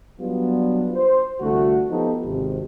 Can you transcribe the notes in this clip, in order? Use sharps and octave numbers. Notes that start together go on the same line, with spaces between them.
F#3 G3 B3 D4 F4
C5
C2 D3 A3 F#4
F3 B3 D#4 G4 A4 B4
G#1 C3